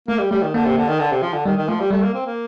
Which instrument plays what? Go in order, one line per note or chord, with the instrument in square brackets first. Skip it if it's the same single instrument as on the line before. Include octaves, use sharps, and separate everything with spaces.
[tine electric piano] A3 [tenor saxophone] A#3
[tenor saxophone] G3
[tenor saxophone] G3 [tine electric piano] A3
[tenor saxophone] D#3
[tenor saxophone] D3 [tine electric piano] A#3
[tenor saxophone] C3
D3
D#3
D3
C3
F3
D3
[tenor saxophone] D#3 [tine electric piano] G3
[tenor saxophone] D#3
[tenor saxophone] F3 [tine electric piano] A3
[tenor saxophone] G3
[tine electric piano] G3 [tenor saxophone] A3
[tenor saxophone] A#3
C4
A#3